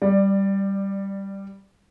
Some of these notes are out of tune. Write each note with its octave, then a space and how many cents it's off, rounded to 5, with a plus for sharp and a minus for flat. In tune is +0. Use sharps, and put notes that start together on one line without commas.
G3 +0 D5 +20